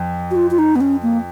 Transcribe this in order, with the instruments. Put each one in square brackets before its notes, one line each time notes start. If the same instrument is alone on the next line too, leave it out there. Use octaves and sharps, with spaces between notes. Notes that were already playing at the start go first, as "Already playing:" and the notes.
Already playing: [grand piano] F2
[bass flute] F#4
F4
F4
D#4
B3
C#4
A#3